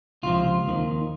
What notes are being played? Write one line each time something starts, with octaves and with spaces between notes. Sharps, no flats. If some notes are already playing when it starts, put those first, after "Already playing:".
C#2 C3 F3 F4
D#2 D#3